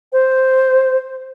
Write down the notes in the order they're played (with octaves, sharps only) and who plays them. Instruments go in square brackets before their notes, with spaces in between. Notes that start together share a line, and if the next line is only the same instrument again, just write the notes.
[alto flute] C5